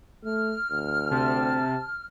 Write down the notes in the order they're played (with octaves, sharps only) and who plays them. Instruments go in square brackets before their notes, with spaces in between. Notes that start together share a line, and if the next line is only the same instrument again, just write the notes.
[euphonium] A3 [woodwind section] F6
[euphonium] D2
[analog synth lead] C3 [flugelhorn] A5